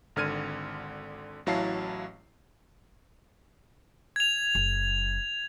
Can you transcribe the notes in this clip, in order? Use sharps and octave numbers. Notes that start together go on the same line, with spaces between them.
G#1 D3 F6 G#6 D#7
A1 F#3 E4 F5 A5 C7
G#6 F7
F#1